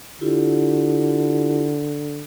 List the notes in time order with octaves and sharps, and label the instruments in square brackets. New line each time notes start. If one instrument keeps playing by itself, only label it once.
[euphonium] D3 [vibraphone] E4 F4 G4